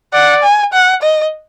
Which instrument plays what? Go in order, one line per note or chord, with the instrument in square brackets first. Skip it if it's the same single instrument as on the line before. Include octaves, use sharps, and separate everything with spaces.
[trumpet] D5 [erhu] F#5
[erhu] G#5
F#5
D#5